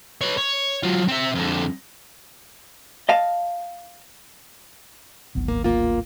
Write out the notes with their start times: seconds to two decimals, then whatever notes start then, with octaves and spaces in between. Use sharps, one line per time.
0.21 B4 C#5
0.37 C#5
0.83 F#3 F4
1.08 C4 E5
1.35 F2 D3
3.09 D#5 F5 A5
5.35 D1 G#1 B3
5.48 A#3
5.64 A#3 F4